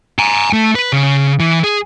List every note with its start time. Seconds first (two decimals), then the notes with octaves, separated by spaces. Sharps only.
0.19 G#5 A#5
0.53 A3
0.75 B4
0.93 C#3
1.40 E3
1.64 G#4